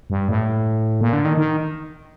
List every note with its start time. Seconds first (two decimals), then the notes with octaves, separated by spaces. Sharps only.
0.10 G2
0.29 A2
1.01 A#2
1.13 D3
1.25 D#3
1.37 D#3